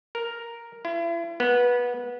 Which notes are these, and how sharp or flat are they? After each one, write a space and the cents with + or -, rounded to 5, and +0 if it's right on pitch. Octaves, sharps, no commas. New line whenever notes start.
A#4 +0
E4 +40
B3 -20